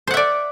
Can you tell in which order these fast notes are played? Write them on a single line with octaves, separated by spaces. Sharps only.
C5 F#5 E5 D5